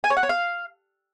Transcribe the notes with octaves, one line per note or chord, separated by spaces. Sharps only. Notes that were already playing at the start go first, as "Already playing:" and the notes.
G#5
C#5
F#5
C#5
F5